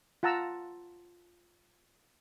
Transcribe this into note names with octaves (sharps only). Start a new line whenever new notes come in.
F4 F#5 A5 A#5 E6